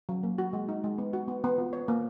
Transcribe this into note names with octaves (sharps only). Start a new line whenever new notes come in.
F#3
A#3
F#4
G#3
D#4
G#3
B3
F#4
B3
B3
F4
C#5
A#3